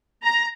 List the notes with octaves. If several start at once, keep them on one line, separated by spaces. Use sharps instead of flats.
A#5